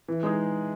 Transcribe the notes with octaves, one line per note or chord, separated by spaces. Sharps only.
E3
G#3 D#4 G#4